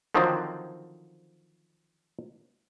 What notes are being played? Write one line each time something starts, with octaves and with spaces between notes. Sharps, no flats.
D3 D#3 F3 F#3 C4